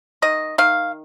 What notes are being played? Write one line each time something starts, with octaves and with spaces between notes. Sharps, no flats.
D#3 D#5
D#3 F5